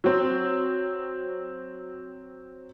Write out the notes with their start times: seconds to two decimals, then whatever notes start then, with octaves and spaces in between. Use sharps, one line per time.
0.04 F#3 C4